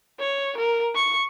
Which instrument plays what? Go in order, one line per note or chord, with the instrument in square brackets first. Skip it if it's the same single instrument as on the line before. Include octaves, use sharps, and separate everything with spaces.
[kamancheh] C#5
A#4
C#6